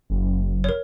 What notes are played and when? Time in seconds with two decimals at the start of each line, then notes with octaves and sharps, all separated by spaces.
0.10 F#1
0.64 A#4 C#5